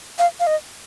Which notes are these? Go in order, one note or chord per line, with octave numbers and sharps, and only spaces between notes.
F5
F5
D#5